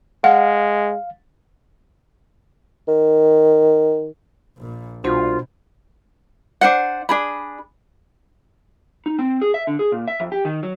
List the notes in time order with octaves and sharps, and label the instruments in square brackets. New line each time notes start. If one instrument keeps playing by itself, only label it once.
[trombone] G#3 [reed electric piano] F5 [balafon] F#5
[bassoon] D#3
[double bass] A#1 A#2
[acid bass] C2 [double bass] B2 [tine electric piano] D4 F#4 C5 [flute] F4
[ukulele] D4 C5 F#5
D4 G#4 B5
[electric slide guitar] D#4
C4
G#4
E5
D3
G#4
A#2
E5
F2
G4
D#3
F#3